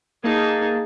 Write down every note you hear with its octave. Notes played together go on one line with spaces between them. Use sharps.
A#3 D#4 G#4 A5